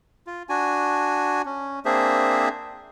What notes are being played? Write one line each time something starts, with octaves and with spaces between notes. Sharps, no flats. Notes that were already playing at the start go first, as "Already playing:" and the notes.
F4
D4 F#4 G#5
C#4
A#3 C4 D4 G#4 C5 E5